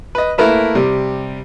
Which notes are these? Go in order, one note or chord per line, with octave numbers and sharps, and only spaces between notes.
B4 D#5
A3 A#3 E4 A#4 B4 E5
C3 G3